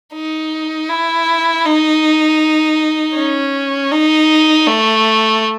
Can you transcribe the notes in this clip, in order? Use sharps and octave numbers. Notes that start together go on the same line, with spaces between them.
D#4
E4
D#4
C#4
D#4
A3